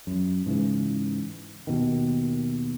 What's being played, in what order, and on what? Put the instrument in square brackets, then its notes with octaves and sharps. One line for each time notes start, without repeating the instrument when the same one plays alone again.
[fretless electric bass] F#2
G#2 C#3 E3
D#2 B2 D#3